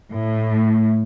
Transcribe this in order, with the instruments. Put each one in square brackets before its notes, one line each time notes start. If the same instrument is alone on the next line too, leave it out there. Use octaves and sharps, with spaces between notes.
[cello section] A2